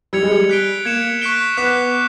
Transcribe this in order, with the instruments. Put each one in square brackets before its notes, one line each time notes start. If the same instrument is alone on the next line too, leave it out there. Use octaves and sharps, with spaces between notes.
[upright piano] G3 [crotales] E6 G#6 C#7 F7
[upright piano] G#3
G3
[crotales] F#6 B6 D7 G7
[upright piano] A#3 [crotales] G#6 C#7 E7
[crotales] C#6 F#6 B6 D7 G7
[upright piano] B3 [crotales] D6 F#6 B6 E7